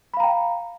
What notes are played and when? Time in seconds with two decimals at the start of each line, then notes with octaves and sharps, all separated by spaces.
0.14 B5
0.17 F5
0.20 A#5
0.23 G5